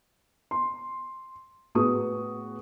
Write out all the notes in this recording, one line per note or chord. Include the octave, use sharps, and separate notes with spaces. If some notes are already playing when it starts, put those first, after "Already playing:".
C6
A2 B3 F#4 G#4 C#6 D#6